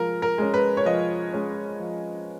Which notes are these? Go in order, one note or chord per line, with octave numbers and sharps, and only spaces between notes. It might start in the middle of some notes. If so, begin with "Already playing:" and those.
Already playing: F3 G#3 A#4
A#4
G#3 C#4
B4
C#5
F3 D#5
G#3 C#4
F3